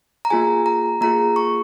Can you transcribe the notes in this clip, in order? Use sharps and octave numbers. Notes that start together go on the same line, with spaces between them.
A#5
A#3 F4 G#4 G#5
A#5
A#3 F4 G#4 A#5
C#6